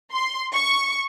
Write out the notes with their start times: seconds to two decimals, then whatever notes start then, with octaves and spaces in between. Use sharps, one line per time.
0.13 C6
0.53 C#6